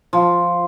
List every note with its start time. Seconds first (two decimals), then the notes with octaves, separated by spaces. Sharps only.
0.13 F3